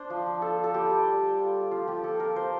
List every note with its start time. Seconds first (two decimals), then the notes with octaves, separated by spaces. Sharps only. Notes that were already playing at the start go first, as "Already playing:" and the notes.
Already playing: D4 C5 D5
0.10 F3
0.26 F3
0.42 F4 A4
0.58 F4
0.64 A4
0.74 G3 G4
0.91 G3
1.07 G3
1.22 G3
1.39 F4
1.55 F4
1.71 F3 F4
1.88 F3 G4
2.04 F4 A4
2.20 F4 A#4
2.36 F3 C5